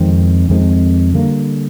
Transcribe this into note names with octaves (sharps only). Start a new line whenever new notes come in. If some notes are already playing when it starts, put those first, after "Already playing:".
Already playing: F2 D#3 G#3 C4
F2 D#3 G#3 C4
D3 G3 A#3